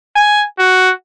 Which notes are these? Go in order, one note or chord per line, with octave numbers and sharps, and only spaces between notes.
G#5
F#4